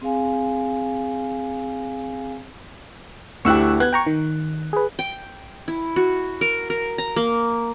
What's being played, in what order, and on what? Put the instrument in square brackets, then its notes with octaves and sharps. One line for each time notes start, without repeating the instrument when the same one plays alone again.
[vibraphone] C4 G#4 F5 G#5
[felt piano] D2 E4 G4 [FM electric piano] C#6 E6 F#6
[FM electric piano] B3 G#6 [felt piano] F#6
[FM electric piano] G5 A#5 C#6
D#3
G#4 B4
[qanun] G5
E4
F#4
A#4
A#4
A#5
A#3